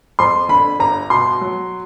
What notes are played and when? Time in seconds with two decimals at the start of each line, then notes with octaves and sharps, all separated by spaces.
0.19 F2 C6
0.49 D3 B5
0.80 G1 A#5
1.10 B2 C6
1.41 F#3